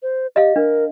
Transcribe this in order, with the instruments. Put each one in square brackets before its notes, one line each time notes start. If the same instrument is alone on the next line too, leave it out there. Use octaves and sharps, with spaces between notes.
[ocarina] C5
[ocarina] G4 [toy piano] D#5 F5
[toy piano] D4 [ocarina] A#4